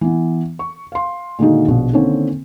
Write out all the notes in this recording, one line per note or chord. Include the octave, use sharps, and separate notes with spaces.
E3 B3
C#6
F5 C6
A#2 D3 D#3 G#3 D#4 F#4
A#1 B2
D3 D#3 A#3 C4 C#4